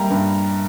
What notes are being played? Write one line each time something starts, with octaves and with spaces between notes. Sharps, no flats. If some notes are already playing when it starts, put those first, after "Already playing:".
Already playing: G3 A#3 A#5
G2